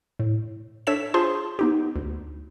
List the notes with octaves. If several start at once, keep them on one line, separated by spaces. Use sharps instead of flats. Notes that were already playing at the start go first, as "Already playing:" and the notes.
A2
D4 A4 C#5 E5 B6 E7
F4 G#4 C5 A5 C6
B3 D#4 G4
D2